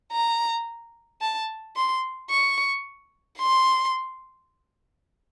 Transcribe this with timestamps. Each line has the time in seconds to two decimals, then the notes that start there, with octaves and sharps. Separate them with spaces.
0.12 A#5
1.22 A5
1.76 C6
2.30 C#6
3.39 C6